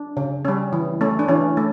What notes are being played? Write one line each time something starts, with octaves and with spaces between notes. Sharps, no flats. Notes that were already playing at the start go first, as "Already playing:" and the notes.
Already playing: D4
C#3
G3 C#4
E3
A3 C#4
D4
E3 C#4
A3